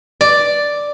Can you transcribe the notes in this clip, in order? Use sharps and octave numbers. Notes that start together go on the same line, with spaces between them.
D5